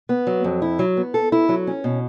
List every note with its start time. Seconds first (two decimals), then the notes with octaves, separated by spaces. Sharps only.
0.09 B3
0.27 F#3
0.44 F2
0.62 E4
0.79 F#3
0.97 B3
1.14 A4
1.32 E4
1.49 F#3
1.67 C#4
1.84 B2